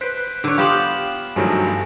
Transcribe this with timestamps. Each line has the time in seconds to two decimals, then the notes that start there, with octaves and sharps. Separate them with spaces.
0.01 B4 C5 F#6 B6 D7
0.44 D3 C#5
0.58 B3 F4 G4 F5 B5 D6 E7 F#7
1.36 G2 D#3 F3 F#3 A3 G#5 A#6 D7